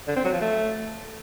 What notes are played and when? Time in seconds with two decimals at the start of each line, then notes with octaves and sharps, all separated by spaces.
0.08 D3
0.16 C4
0.24 F#3
0.33 F3
0.41 A3